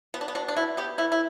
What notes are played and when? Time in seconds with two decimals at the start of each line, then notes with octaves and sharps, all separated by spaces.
0.14 B2 B3
0.21 D4
0.28 B3
0.35 B2 D4
0.48 D4
0.56 B2 E4
0.77 B3 G4
0.98 E3 E4
1.12 E4